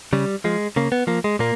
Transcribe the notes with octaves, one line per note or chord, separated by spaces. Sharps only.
C#3 G3
F3 G#3
C#3 A#3
B3
F3 A#3
G#3
A#2 A#3